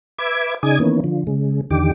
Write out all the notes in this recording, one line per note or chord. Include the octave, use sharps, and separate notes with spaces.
B4 E5 D6 G#6
C#3 D#4 G#4 D5 D#6 G#6
D#3 E3 A#3 B3 C#4
D3 F3
C#3 G#3
E2 D3 D#3 G4 D6